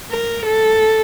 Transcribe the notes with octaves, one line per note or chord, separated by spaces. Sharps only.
A#4
A4